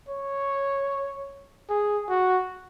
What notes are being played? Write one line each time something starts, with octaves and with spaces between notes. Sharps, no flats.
C#5
G#4
F#4